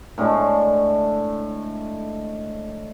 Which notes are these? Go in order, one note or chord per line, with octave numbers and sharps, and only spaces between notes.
A2 D3 G#3 A3